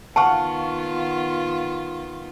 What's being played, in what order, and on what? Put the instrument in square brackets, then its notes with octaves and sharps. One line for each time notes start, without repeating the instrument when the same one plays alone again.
[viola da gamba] D#3 B3 F4 [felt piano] F5 F#5 C#6 [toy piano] A5